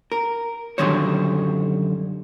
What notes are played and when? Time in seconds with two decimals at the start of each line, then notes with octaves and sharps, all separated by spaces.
0.12 A#4
0.78 F#2 D3 D#3 G3 C5 C#5